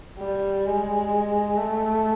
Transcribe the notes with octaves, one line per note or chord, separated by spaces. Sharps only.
G3
G#3
A3